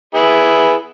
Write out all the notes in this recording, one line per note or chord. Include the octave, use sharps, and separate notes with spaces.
B3 E4 G#4